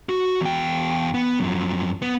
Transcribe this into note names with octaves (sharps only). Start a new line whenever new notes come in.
F#4
E2 G5
B3
F#2 F3
B3